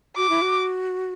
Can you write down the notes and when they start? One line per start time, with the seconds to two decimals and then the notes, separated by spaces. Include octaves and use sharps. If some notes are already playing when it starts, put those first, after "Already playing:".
0.17 F#4 D6
0.29 E4
0.42 F#4